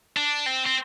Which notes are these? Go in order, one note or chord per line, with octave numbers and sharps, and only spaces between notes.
D4
C4
C4